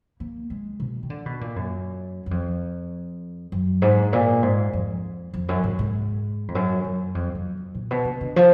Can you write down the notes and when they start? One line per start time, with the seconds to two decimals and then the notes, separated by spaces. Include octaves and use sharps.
0.20 A#3
0.50 G#3
0.80 B2
1.03 D#3
1.10 D3
1.26 B2
1.41 A#2
1.56 F#2
2.26 F#2
2.31 F2
3.52 F#2
3.82 G#2
4.13 A#2
4.43 G#2
4.73 F2
5.34 F2
5.49 F#2
5.64 G#2
5.79 G#2
6.48 F2
6.55 F#2
6.85 F#2
7.15 F2
7.35 F#2
7.75 A#2
7.91 B2
8.05 D3
8.21 D3
8.36 F3